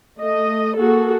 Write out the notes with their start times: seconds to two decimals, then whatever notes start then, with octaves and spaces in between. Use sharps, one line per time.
0.20 A3 D#5
0.77 A#3 F#4 G#4 A4